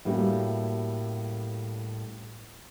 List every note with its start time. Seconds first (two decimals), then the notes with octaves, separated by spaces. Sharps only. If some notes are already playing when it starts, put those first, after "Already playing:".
0.05 A2 G3 A#3 C#4 F4 F#4